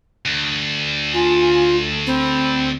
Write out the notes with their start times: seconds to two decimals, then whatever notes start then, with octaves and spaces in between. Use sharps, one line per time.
0.25 D2
1.14 F4 G#5
1.67 A3
2.07 C4 B5